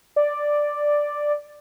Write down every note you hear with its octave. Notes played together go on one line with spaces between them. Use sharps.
D5